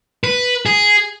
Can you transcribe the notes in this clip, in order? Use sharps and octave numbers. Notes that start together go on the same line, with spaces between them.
B4
G#4